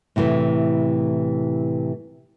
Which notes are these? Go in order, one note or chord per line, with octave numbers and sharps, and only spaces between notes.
A2 C3 E3 A3